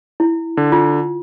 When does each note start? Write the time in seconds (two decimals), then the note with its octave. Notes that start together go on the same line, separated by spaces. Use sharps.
0.20 E4
0.57 D3
0.72 F4